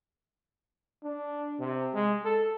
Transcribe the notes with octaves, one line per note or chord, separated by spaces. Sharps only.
D4
C3
G#3
A4